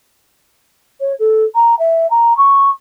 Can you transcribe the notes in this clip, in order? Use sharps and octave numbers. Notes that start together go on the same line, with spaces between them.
C#5
A4
A#5
E5
A#5
C#6